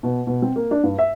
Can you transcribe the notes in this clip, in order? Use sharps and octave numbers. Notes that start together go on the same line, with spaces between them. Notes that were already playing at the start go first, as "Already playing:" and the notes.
B2
B2
C4
A#3
D4
G2
E5